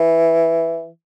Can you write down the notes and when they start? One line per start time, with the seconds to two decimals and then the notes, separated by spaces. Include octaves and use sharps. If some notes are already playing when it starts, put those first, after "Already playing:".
Already playing: E3